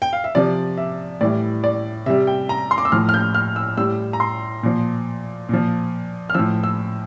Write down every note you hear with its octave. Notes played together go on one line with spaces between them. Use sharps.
G5
F5
E5
C3 F3 D5
E5
A2 E3 G3 D5
D5
C3 G3 E5
G5
A#5
C6
D6
E6
A2 F3 F6
F6
G6
F6
E6
A2 G3 E6
A#5
C6
A#2 F3
A#2 F3
F6
A2 F3 E6
E6